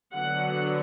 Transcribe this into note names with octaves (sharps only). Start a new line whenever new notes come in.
D3 F#3 B3 D4 F#5